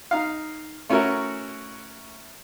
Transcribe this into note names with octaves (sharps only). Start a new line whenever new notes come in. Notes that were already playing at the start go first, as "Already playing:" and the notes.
D#4 F5
A3 C#4 E4 F#4 A#4